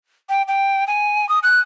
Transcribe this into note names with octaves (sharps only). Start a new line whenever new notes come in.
G5
G5
G#5
D#6
F#6